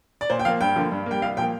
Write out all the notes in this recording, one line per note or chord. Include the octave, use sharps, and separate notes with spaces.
D5
A#2 C5
G5
F3 A#3 F5
G2 G5
D3 F3 A#3
G2
G3 A#3 G5
C2 F5
A#2 F3 A#3 G5